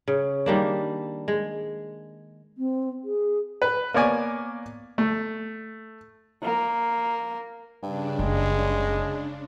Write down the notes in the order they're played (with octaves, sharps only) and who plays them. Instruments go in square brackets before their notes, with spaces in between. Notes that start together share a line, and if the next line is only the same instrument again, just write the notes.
[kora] C#3
D#3 G3 A#3 D4
G#3
[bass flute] C4
G#4
[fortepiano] B4
A#3 B3 C#5 D5 G#5
A3
[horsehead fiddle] A#3
[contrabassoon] G2 [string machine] C#3 D4
[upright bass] F#1 [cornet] G#3